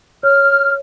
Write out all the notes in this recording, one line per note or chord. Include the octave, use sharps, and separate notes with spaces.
C#5 F6